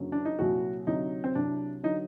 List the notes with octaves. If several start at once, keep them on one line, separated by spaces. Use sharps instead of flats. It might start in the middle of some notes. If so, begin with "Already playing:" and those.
Already playing: F#1 F#2 D3 F#3
D4
D#4
C2 A#2 F#3 F#4
D2 C3 F#3 D#4
C4
C2 C3 F#3 D4
D3 F#3 D#4